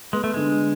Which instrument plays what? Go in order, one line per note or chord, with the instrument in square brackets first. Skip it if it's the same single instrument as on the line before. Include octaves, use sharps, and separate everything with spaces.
[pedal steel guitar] G#3 [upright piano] B3
[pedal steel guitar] A3
[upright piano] D3 [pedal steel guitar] G#3